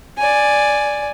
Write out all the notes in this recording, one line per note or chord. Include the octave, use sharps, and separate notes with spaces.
D5 G#5